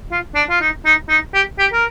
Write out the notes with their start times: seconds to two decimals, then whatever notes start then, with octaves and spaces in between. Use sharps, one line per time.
0.11 F4
0.35 D4
0.50 F4
0.61 D#4
0.86 D#4
1.09 D#4
1.34 G4
1.59 G4
1.73 A#4